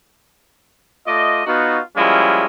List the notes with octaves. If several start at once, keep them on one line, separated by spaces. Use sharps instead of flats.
A3 F4 D5 D#5
B3 D#4 F4 F#4
F3 G3 G#3 A#3 C#4 E4